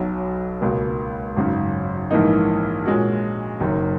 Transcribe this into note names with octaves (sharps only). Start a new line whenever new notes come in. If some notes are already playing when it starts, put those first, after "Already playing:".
Already playing: B1 B2 F#3
C#2 B2 A#3
G#1 F#2 C#3
A#1 G#2 E3 A#3 D#4
A#2 G#3 C#4 F#4
F#1 F#2 D#3